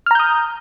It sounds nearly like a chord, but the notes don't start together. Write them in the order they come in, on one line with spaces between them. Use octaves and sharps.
F6 A#5 G6 D#6